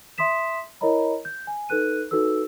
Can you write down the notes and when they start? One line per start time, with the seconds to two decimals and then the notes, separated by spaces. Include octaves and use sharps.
0.18 E5 C6 D#6 B6 E7
0.81 E4 A#4 C#5 D#5 A#5 B5
1.25 G6
1.47 G#5
1.69 D#4 A4 B4 F#6 D#7
2.11 D#4 F#4 A4 B4 E6